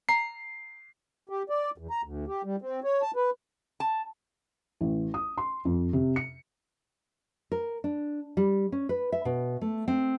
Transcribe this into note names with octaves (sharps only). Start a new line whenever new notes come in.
A#5 C7
G4
D5
E2
A#5
D2
G4
G3
C4
C#5
A5
B4
A5
A1
D#6
C6
F2
C3
C#7
A#4
D4
G3
C#4
B4
E5
B2
A3
C4